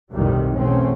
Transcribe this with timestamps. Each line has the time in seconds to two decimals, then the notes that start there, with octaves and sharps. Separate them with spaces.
0.13 B1 F2 A2 C3 D#3 G3
0.57 E2 B2 A3 C4 C#4